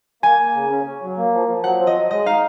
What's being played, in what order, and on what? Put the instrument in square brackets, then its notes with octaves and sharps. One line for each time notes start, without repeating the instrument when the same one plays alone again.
[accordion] A#3 [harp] G#5
[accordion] A#3
C#3
C#4
C#4
F#3
A#3
F3
F3
[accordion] F#3 [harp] F#5
[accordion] C4
[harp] D#5
[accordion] F#3
[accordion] G#3 [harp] D#5
[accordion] D#4 [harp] F5